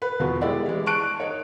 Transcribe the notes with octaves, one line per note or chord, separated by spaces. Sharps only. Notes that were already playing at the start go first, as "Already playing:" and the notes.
B4
B1 E2 B3 F4 F#4
G#3 E4 G4 D5 E5
E3 G#3
A5 C#6 F#6 D7
D#4 C#5